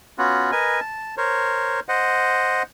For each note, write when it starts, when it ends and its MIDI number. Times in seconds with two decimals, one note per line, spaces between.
0.18 0.51 59
0.18 0.51 61
0.18 0.51 65
0.18 0.51 66
0.52 0.80 70
0.52 0.80 71
0.52 0.80 75
0.52 0.80 80
0.80 1.15 81
1.17 1.80 70
1.17 1.80 72
1.17 1.80 73
1.89 2.63 72
1.89 2.63 75
1.89 2.63 78